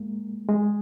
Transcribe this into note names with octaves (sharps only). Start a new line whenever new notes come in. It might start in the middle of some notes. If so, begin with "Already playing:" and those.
Already playing: G#3 A#3
G#3